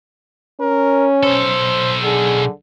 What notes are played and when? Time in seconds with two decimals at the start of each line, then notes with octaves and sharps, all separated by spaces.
0.60 C#4 A#4
1.23 B1 A4 C5
2.03 D3 G#4